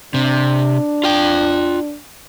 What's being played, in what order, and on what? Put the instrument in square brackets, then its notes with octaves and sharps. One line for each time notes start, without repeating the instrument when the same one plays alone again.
[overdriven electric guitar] C3 [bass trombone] D4
[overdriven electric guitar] F4 G5